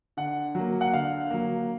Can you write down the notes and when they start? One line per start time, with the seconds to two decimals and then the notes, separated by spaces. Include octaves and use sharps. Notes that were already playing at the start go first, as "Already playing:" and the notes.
0.17 D3 F#5
0.55 F#3 A#3
0.81 F#5
0.93 D3 F5
1.30 F#3 A#3